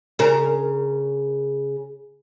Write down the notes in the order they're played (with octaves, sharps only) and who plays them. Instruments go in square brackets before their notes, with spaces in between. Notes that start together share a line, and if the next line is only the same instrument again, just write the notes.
[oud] C#3 A#4